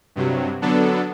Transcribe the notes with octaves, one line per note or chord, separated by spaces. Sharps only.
G2 C3 F#3
D3 F#3 B3 D4 A4